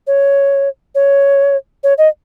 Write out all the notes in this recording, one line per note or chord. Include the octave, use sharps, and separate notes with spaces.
C#5
C#5
C#5
D#5